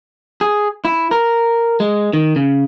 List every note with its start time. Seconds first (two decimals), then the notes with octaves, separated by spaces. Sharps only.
0.41 G#4
0.85 E4
1.11 A#4
1.80 G#3
2.13 D#3
2.36 C#3